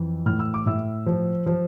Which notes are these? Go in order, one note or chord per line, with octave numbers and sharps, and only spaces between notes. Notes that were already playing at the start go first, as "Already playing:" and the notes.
Already playing: F2 E3
A2 F6
E6
D6
A2 E5 E6
F3
F3